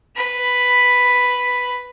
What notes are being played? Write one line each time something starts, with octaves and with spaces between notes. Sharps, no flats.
B4 B5